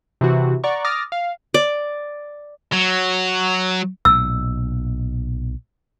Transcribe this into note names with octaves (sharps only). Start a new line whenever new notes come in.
C3 E3 F#4
D5 F#5 A#5 C#6
D6 D#6 F6 A6 A#6
F5
D5
F#3
B1 A#2 E6